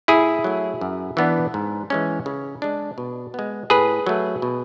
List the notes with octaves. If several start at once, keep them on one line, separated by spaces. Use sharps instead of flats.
A2 E4 G#4
F#3 A3
F#2
E3 B3 D4
G#2
E3 G#3 C#4
C#3
G#3 D4
B2
G#3 B3
A2 G#4 B4
F#3 A3
B2